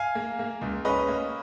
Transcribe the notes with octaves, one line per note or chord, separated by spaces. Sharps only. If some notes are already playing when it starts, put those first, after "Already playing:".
Already playing: F5 G#5
A#3
A#3
C#2
C#4 B4 D#5
A#3